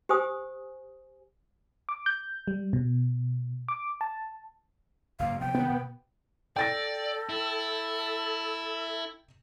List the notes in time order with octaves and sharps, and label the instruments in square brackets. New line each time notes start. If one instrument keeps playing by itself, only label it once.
[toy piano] G4 C5 G#5 D#6
[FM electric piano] D6
G6
G3
B2
D6
A5
[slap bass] F#1 G#2 A#3 [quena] F5
[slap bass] C3 F3 B3 [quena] G5
[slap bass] C3 D#3 [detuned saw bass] B3
[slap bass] B2
[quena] A4 [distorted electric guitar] D5 [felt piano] G5 A6 A#6
[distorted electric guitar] E4